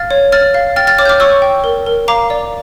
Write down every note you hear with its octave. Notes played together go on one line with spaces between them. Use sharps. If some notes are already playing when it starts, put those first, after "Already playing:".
Already playing: F5 F6 A6
C#5
C#5 F6 A6
F5
G5 F6 A6
F6 A6
C#5 D6 F6
G6
D6 F6
C#5 C#6 E6
G5
A#4
A#4
F5 A#5 D6
D5